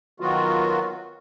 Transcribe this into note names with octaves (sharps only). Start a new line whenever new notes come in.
D#3 F#3 B3 F4 F#4